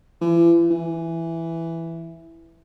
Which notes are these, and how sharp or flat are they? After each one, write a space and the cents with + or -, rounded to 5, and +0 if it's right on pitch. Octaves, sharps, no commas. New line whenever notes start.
E3 +40
E3 +5